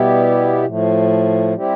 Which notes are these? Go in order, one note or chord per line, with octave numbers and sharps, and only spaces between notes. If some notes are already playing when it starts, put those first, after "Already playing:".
Already playing: B2 G3 B3 E4 G4
A2 F3 A3
G3 C4 E4 G4